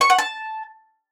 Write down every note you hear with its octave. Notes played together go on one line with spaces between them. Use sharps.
C#6
F#5
A5